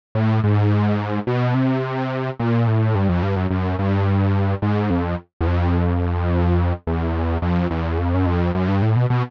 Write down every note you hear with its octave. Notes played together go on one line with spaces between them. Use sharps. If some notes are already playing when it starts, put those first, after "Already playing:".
A2
G#2
B2
C3
A#2
A2
G2
F2
G2
F#2
F#2
G2
G#2
F2
E2
F2
E2
F2
E2
F2
F#2
F2
F#2
G2
A2
B2
B2